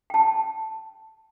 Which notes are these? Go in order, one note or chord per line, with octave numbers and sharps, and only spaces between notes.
G5 A5